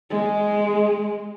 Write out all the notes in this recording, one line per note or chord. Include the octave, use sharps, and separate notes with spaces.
G#3